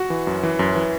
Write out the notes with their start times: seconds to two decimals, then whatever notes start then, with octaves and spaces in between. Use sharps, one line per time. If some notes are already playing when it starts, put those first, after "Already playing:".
Already playing: F#4
0.10 E3
0.27 F#2
0.43 E3
0.59 F#2
0.75 E3